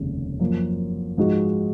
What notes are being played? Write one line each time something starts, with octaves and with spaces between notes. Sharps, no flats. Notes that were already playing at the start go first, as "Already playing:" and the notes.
Already playing: F1 D#2 C#3 G#3 C#4
F#2 F3 A#3
G#2 F3 G#3 D#4 F#4